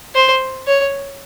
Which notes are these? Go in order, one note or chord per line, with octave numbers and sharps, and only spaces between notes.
C5
C#5